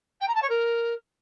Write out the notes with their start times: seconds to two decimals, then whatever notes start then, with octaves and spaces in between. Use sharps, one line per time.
0.20 G5
0.28 A#5
0.35 A5
0.42 C#5
0.49 A#4